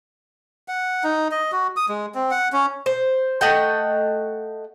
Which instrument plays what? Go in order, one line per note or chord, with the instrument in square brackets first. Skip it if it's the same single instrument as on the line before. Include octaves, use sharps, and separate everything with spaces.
[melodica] F#5
D#4
D#5
F#4
D#6
G#3
C4
F#5
C#4
[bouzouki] C5
A3 D#5 F#5 G5